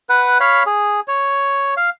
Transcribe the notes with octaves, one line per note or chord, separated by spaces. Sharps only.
B4 F#5
C#5 F5 B5
G#4
C#5
F5